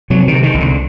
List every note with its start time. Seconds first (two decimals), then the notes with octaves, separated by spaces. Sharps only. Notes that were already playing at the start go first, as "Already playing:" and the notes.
0.10 C3 F#3
0.28 C3 D#3
0.43 D#3
0.54 C2
0.60 D3